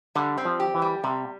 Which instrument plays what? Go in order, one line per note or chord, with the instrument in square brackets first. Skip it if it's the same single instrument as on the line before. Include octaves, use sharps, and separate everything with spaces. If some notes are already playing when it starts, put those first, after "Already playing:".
[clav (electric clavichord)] D3 [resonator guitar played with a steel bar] G3
[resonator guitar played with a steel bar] C4
[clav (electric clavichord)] F3
[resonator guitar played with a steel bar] G4
[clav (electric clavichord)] E3
[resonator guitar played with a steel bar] G3
[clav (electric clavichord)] C3 [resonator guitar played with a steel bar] G3